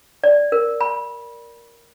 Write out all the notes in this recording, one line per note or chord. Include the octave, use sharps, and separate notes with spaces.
D5
A#4
B5